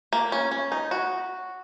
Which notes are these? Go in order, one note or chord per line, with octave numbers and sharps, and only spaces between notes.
A#3
C#4
C#4
D#4
F#4